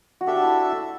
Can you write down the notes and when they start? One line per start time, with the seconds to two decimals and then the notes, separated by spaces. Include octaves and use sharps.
0.21 F#4
0.27 D4 G4 A4 E5
0.35 F#4
0.43 E4